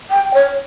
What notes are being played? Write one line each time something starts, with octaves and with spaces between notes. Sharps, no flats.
G5
C#5